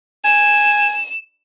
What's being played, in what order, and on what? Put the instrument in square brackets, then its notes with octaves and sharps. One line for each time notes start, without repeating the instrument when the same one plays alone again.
[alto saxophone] G#5 [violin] E7